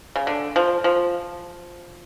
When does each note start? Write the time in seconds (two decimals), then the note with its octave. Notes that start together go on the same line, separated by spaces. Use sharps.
0.16 C#3
0.27 D3
0.56 F3
0.84 F3